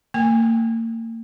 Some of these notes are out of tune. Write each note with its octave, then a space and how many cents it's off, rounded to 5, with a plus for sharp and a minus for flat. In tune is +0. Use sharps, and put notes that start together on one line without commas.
A#3 -40 G#5 -25